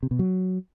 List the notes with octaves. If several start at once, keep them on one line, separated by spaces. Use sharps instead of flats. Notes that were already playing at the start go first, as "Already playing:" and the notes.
C3
B2
F#3